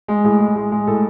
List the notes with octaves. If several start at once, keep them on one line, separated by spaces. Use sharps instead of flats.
G#3
A2 G#4
G#3
G#3
G#3
A2 A4